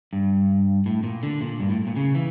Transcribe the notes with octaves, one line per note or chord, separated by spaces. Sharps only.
G2
A2
A#2
D3
A#2
G2
A2
A#2
C#3
E3